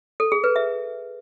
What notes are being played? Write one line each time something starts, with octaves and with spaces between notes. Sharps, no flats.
A4
G#4
B4
E5